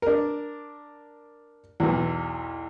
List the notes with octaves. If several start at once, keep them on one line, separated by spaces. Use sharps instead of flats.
D4 A#4
B1 E2